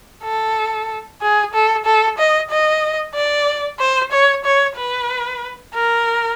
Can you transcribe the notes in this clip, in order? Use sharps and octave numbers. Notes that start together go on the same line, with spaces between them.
A4
G#4
A4
A4
D#5
D#5
D5
C5
C#5
C#5
B4
A#4